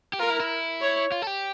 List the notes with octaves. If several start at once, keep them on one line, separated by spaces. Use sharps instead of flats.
G4
F4 A#4
E4
E4
C#5
F4
A4
G4